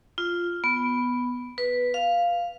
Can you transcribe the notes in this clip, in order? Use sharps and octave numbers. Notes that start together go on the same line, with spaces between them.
F4
B3
B4
F5